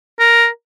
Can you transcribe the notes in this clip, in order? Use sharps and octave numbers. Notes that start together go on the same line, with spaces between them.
A#4